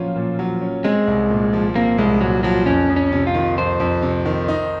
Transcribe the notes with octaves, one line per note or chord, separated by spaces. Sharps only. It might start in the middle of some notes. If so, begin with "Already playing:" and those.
Already playing: A#2 F3 F#3 C#4 F4
A#2
F#3
C#4
G#3 C4
C2
A#2
F3
A#3 C4
C2 G#3
A#2 F#3
F3 F#3
F2 C#4
F2
C#4
C3
F4
D#3
F2 C5
F2
C3
D#3
D#4